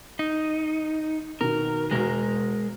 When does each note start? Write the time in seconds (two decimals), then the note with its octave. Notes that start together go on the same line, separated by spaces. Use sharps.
0.19 D#4
1.41 B2 D#3 A#4
1.91 E1 G#3 F#4 A#4 A#6